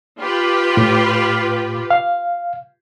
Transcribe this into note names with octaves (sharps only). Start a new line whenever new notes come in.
F4 G4 B4
A2
F5